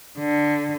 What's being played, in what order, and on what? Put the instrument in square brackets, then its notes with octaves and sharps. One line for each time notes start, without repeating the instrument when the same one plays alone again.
[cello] D3